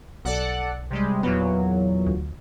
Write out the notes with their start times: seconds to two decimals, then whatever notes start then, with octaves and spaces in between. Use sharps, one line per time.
0.25 B1 A4 D5 F#5
0.90 C3 G3 G#3
1.23 E2 A#2 F#3 B3
2.06 D2